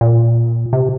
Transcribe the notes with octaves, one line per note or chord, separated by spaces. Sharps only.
A#2
C3